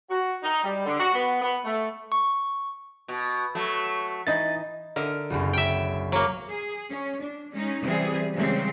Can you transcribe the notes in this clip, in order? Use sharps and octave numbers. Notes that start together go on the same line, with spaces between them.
F#4
D#4
G3
D3
F#4
B3
B3
A3
C#6
B2
F#3 A3
E3 D#4 D#5 A6
D3 A#4 D#5 E5
F#1 B1 F#2
E5 G5
F#3 A#3
G#4
C#4
D4
G#3 C#4 D#4
C3 E3 G3 C4 G#4
C#3 E3 G3 G#3 C4